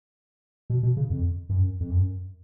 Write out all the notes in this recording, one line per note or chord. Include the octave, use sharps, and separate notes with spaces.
B2
B2
C#3
F2
F#2
F2
F#2